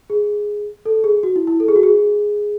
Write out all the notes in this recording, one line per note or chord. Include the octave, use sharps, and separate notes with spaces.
G#4
A4
G#4
F#4
E4
E4
A4
G#4
F#4
G#4